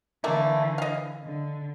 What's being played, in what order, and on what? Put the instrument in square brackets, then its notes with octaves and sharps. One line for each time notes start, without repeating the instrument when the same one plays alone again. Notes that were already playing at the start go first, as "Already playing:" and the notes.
[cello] D3 E3 [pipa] A3 A#3
[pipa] D#5 F5
[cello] D3